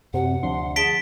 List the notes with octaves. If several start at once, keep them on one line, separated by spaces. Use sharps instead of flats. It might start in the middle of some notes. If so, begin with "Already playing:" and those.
F#2 C3 F#5
D2 F3 D4 C6
G#4 A5 B6 D7 G7